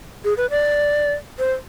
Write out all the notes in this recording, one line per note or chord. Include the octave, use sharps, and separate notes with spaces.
G#4
B4
D5
C5